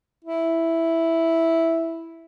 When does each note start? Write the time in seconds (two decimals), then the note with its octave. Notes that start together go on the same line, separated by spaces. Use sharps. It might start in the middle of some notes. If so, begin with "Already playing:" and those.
0.24 E4